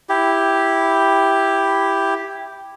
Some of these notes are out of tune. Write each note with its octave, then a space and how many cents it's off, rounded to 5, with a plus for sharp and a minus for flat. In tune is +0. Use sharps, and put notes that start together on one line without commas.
E4 +0 G4 +0